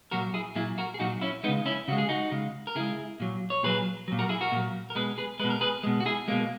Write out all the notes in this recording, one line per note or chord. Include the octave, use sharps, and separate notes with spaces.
A#2 F#3 F#4 A#4
E4 G#4
A#2 F#3 E4 G#4
F#4 A#4
G#4
A#2 F#3 D#4 F#4
C#4 E4
C#3 G#3 B3 D#4
C#4 E4
C#3 G#3 F#4
G#4
D#4 F#4
C#3 G#3
A#4
C#3 G#3 E4 G#4
A#2 F#3
C#5
A#2 F#3 G#4 B4
A#2 F#3
F#4 A#4
E4 G#4
F#4 A#4
A#2 F#3
A#4
B2 G#3 G#4 B4
G#4 B4
B2 G#3 B4
A#4
G#4 B4
B2 G#3
F#4
E4 G#4
B2 G#3 A#3